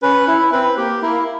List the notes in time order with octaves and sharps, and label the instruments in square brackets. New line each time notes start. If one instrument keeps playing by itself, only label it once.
[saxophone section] C#4 [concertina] B4
[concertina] E4
[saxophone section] C4 [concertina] B4
[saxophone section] A#3 [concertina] G4
[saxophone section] A#3 [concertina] E4